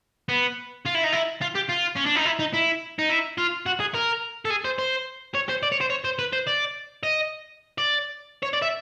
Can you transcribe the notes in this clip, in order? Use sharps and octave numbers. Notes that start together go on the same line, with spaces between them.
B3
F4
E4
D#4
E4
F4
G4
F4
C#4
D4
D#4
E4
D#4
E4
D#4
E4
F4
F#4
G#4
A#4
A4
G#4
C5
C5
C#5
C5
D5
C#5
C5
C#5
C5
B4
C5
D5
D#5
D5
C#5
D5
E5